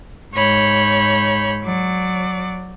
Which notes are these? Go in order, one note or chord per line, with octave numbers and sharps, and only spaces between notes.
G#2 C#5 B5 G6
F#3 D5